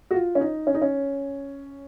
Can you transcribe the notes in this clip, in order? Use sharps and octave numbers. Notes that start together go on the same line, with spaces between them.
F#4
F4
C#4
D#4
C#4
D#4
C#4